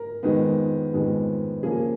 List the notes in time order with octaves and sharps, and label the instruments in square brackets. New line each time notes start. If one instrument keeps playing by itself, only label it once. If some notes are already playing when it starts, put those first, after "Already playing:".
Already playing: [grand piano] A#4
F2 D#3 G#3 B3
F2 D#3 G#3 B3
C#3 F3 A#3 G#4